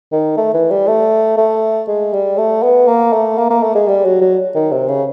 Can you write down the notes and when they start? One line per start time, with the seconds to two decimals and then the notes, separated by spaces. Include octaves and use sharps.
0.12 D#3
0.37 A3
0.54 E3
0.71 G3
0.88 A3
1.37 A3
1.88 G#3
2.13 G3
2.38 A3
2.63 B3
2.88 A#3
3.13 A3
3.38 A#3
3.50 A#3
3.63 A3
3.75 G#3
3.88 G3
4.05 F#3
4.21 F#3
4.55 D#3
4.71 C3
4.88 C#3